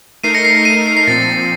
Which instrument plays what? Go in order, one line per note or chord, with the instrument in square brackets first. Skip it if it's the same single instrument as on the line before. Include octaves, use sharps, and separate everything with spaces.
[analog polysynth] A3 D#4 A#4 [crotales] C7 D#7
[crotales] A#6 C#7
C7
A#6
C7 D#7
C7 D#7
C7
[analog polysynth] A#2 F3 C4 [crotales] A6